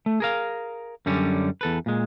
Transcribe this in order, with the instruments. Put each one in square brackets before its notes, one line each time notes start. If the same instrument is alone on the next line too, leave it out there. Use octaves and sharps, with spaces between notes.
[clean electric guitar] A3
G#4 A#4 F5
F#2 D3 G3 C#4
E2 A4 B4
A#2 G#3